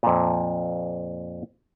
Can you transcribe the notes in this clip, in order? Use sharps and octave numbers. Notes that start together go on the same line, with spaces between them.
F2 A#2